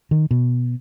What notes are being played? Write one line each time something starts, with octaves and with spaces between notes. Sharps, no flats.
D#3
B2